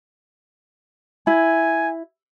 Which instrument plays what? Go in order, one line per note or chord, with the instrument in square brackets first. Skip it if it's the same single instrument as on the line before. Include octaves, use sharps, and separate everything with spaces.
[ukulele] E4 [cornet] G#5